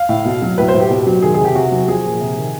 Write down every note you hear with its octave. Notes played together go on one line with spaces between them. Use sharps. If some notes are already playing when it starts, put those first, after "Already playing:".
Already playing: F5
A2
B2
F#3
A2 B4
C5
A2
G4
B2
F#3
D#3 G#4
G#4
C3 G4
C3 F#4
F#3
F3 G#4
A#2
C3
D#3